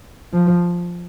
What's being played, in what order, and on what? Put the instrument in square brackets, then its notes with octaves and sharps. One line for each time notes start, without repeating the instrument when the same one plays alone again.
[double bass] F3